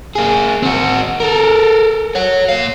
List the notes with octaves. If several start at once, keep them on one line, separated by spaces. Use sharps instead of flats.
A#3 G#4
C4 F#4
A4 A#4
C#5 F#5
A#2 F5